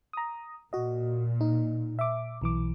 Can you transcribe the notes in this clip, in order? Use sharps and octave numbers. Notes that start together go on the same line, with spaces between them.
A#5 D#6
A#2 F#4 D#5
D#4
E5 D6
B1 E3 D6